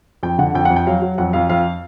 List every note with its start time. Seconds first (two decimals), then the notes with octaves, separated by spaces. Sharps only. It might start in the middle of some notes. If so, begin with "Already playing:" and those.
0.23 F2 G5
0.39 D3 F#5
0.55 F2 G5
0.65 F#5
0.70 F2
0.76 G5
0.87 F#3 F5
1.02 F#3
1.18 F2 F#5
1.33 F2 F5
1.50 F2 F5